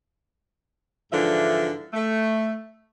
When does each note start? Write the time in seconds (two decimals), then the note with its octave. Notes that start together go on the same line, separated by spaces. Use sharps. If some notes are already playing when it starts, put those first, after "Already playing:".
1.12 G#2 D3 E3 F3 D4 E5
1.94 A3